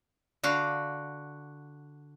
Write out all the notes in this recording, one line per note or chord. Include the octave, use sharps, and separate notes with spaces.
D3 F#4 F5